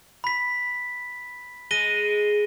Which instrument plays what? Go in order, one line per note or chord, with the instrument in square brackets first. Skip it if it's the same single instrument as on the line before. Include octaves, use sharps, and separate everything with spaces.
[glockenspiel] B5 B6
[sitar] G#3 [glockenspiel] A#6 D#7 G7